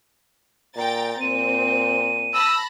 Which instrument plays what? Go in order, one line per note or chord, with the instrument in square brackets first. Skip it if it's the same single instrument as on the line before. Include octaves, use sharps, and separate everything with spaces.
[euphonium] A#2 [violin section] G5 A#5 A6
[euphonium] A#2 [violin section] C4 [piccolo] D#7
[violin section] A5 B5 A#6 [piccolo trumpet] E6